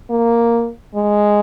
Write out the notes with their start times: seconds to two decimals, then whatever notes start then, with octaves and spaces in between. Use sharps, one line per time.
0.10 A#3
0.95 G#3